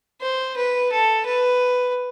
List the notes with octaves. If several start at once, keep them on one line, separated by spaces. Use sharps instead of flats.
C5
B4
A4
B4